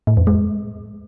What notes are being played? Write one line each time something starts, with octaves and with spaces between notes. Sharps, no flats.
A2
F2
G#3